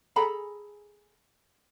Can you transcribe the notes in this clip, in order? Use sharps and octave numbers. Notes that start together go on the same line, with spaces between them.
G#4 A4 A#5 B5